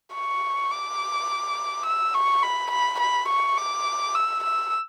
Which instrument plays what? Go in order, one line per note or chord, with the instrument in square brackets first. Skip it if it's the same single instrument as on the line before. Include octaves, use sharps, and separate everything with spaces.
[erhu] C#6
D6
E6
C#6
B5
B5
B5
C#6
D6
E6
E6